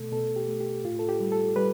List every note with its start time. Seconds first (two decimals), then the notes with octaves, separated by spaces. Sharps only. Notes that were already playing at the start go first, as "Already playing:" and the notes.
Already playing: B2 A3 A4
0.12 B2 A4
0.36 G4
0.48 A3
0.60 G4
0.84 A2 F4
0.99 A4
1.09 G4
1.20 G3
1.32 A4
1.56 G3 B4